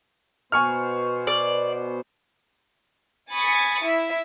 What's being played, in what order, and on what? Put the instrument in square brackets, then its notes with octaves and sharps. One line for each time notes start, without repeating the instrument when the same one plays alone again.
[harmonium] B2 B3 C5 [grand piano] G#5 C#6 F6
[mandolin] D5
[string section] G#5 B5 C#6 D#6 A6 C#7
E4 E5